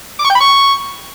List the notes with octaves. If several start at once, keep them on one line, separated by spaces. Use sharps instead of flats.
D6
C#6
G5
B5
C#6